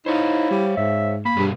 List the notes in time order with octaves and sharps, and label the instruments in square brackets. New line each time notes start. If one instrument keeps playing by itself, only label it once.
[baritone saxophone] D#4 [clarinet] E4 [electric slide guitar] C5 C#5 F5
[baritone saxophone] G3
[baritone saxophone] G#2 [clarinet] E5
[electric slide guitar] A#3 [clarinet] B5
[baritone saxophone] G2 [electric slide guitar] B2 A#3 G#4